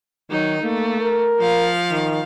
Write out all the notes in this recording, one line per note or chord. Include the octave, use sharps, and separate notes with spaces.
D#3 F#3 D#4
A3 A#3
A#4
F3 F5
D#3